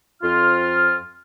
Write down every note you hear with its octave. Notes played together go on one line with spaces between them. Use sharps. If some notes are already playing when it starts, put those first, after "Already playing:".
F2 F4 F6